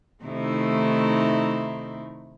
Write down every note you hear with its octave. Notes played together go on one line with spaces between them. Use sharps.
C3 D#3 A3 D#4 E4